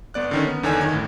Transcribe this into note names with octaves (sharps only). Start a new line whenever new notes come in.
G1 B3 D5 F#6
D3 D#3 C#4
B3
E2 D3 D#3 C#5 G#5
G1 D#3 G#6
A1 A2